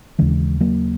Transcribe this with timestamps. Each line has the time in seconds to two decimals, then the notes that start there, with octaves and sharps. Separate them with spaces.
0.19 D#2 C#3 E3 G#3
0.60 F#3 A#3